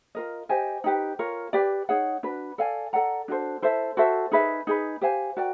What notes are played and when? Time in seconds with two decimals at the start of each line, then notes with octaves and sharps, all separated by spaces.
0.15 F4 A#4 D#5
0.49 G4 C5 D#5 G#5
0.84 D#4 G4 B4
1.19 F4 A#4 C#5
1.53 G4 B4 D5
1.89 D#4 G#4 C#5 F#5
2.23 D4 F#4 B4
2.58 A4 D5 F5 G#5
2.93 A4 D5 F#5 A#5
3.28 D4 F#4 A4 C5
3.62 E4 A4 C5 E5
3.97 F#4 A4 C5 E5
4.31 D#4 G#4 B4 E5
4.67 D#4 G#4 B4
5.01 G4 C5 F5 G#5
5.37 F#4 A#4 D5 G5